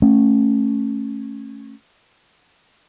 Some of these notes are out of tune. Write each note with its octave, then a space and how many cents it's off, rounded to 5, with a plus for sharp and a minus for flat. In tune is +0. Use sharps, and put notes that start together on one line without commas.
A3 +0 C#4 -20